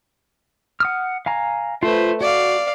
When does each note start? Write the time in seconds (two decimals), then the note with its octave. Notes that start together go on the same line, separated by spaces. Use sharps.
0.80 F#5 D#6 F6
1.26 F5 G#5 A#5
1.83 A3 F4 B4 C5
2.21 F#4 D5 F5